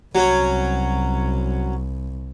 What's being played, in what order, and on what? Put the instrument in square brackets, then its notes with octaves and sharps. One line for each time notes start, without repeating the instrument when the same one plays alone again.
[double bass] C2 [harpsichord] F#3 C#4